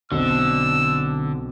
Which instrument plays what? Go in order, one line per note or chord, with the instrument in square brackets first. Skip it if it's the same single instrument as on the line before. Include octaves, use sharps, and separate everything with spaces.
[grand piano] B1 C4 [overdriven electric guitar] D3 [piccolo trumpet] E6